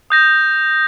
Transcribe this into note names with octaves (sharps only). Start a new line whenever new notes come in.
D#6 G6 A#6